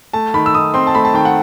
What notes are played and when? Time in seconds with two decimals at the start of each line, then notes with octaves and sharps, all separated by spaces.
0.13 A3 A5
0.34 D#3 B5
0.46 E6
0.55 D#3 D#6
0.74 C4 C6
0.87 A5
0.95 A3 B5
1.05 A5
1.14 D#3 G5
1.25 F#5